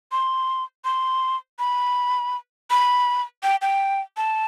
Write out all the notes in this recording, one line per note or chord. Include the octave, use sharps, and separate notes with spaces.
C6
C6
B5
B5
G5
G5
A5